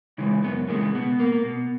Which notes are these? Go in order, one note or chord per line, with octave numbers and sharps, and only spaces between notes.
C#3 E3 G#3
F#2 B3
C#3 E3 G#3 A#3
B2 B3
A#3
B2